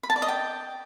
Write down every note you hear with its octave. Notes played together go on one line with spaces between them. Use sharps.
B5
A5
D5
D#5
G5